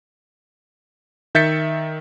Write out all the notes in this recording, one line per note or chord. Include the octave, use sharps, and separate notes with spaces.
D#3 E5 G6 A6 B6 C#7